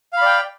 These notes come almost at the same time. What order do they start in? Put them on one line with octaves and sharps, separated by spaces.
F5 B5 D5 G5